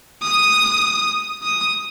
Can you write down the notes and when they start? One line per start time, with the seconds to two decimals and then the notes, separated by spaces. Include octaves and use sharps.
0.22 D#6
1.43 D#6